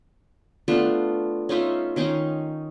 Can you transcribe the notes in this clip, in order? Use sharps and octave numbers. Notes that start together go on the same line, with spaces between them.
A3 B3 D4 F4
C#4 D#4 F4 E5
D#3 C#4 D#4 C6